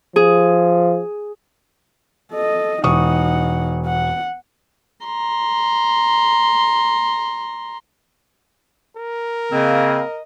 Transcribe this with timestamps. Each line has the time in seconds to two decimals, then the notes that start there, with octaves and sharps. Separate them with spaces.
0.16 F3 G#4
2.33 A4 D#5
2.84 E1 D#4 F#5 C#6 D#6
3.86 F#5
5.05 A#5 C6
8.97 A#4
9.52 C#3 A#3 C4 D#5